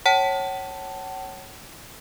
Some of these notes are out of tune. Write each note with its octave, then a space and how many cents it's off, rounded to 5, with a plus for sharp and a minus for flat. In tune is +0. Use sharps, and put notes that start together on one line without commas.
C#5 -15 F#5 +45 A5 +0